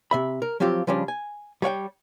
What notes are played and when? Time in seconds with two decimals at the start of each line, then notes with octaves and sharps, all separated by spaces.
0.11 C3 E5 B5
0.42 A#4
0.60 F3 F#3 C4 F4 G4
0.87 C#3 F3 G3 C#4 D4
1.08 G#5
1.62 G3 C#5 F#5 G5